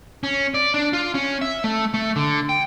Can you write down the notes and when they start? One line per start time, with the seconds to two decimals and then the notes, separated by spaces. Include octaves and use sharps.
0.23 C#4
0.54 D5
0.74 D4
0.93 F4
1.14 C#4
1.41 E5
1.64 A3
1.94 A3
2.16 D3
2.49 G5